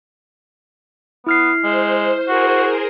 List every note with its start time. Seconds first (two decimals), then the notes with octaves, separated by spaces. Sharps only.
1.27 B3 E4 F6 C7
1.64 G#3 C5
2.29 F#4 G#4 A#4 C5